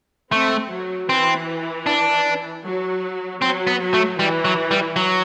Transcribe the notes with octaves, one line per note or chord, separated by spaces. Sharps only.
A3 C4
F#3
E3 C4
D4
F#3
F#3 C4
B3
F#3
A3
E3 G3
F#3
G3
F#3